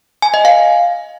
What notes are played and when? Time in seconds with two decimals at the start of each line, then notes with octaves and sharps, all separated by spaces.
0.22 G#5
0.34 D#5
0.45 F5